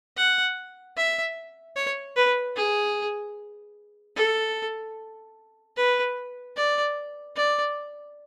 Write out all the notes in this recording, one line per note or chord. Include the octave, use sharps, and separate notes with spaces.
F#5
E5
C#5
B4
G#4
A4
B4
D5
D5